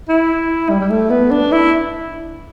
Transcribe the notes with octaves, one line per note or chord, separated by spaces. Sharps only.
E4
G3
G3
A3
B3
D4
E4